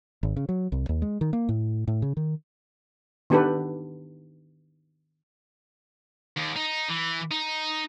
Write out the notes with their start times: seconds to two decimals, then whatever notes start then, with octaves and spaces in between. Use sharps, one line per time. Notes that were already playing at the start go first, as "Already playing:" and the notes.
0.23 G#1
0.36 C#3
0.49 F#3
0.72 C2
0.89 D#2
1.02 G#3
1.21 D#3
1.33 A#3
1.49 A2
1.88 A2
2.02 C#3
2.17 D#3
3.30 D#3 B3 D4 G4 A4 B4
6.37 D#2
6.56 D#4
6.89 E3
7.31 D#4